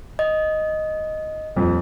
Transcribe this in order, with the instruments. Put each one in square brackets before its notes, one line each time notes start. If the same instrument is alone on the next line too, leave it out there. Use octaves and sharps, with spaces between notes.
[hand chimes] D#5
[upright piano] D#1 F2